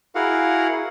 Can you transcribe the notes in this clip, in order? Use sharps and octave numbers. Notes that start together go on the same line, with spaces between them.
E4 F#4 G#4 A#4 F5 F#5